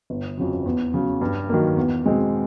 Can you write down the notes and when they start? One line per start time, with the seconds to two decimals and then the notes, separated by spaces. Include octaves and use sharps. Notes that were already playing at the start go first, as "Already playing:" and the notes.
0.10 G1
0.37 F2 C#3 F#3
0.66 E2
0.93 C#3 F#3
1.21 G2
1.49 D#3 F#3 A#3
1.77 E2
2.05 B2 G#3 C4